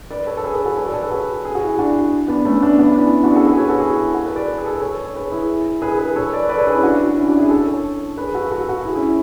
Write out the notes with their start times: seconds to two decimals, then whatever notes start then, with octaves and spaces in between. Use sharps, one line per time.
0.11 B4 D5
0.27 A4 C#5
0.37 A4
0.44 G#4 B4
0.55 G#4 B4
0.65 F#4 A4
0.77 A4 C#5
0.86 B4 D5
0.94 A4 C#5
1.02 G#4 B4
1.10 F#4 A4
1.45 G#4
1.55 F#4
1.64 E4 G#4
1.79 D4 F#4
2.28 B3 D4
2.45 A3 C#4
2.62 B3 D4
2.79 B3 D4
2.91 D4
2.96 C#4 E4
3.24 D4 F#4
3.31 G#4
3.36 F#4 A4
3.46 G#4 B4
3.58 A4 C#5
3.69 F#4 A4
3.80 E4 G#4
4.13 F#4 A4
4.25 G#4 B4
4.36 B4 D5
4.58 G#4
4.66 A4
4.73 B4
4.81 A4 C#5
5.04 C#5
5.14 G#4 B4
5.32 E4 G#4
5.82 G#4 B4
5.99 G#4 B4
6.16 A4 C#5
6.33 B4 D5
6.49 B4 D5
6.57 A4 C#5
6.67 G#4 B4
6.75 C#4 E4
6.83 D4 F#4
7.17 C#4 E4
7.28 D4 F#4
7.39 E4 G#4
7.50 A4 C#5
7.67 A4 C#5
8.17 G#4 B4
8.34 F#4 A4
8.51 F#4 A4
8.68 F#4 A4
8.85 E4 G#4
8.96 C#4 E4